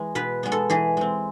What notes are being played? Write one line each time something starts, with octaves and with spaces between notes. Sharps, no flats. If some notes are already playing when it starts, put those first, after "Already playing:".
Already playing: E3 G#3
B2 B4
G#3 B3
A4
E3 G#4
G#3 C4